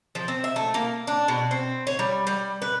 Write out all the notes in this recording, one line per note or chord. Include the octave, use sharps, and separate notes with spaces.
F3
C4
E5
A3
A#3
D4
B2
C4
C#5
G3
G3
B4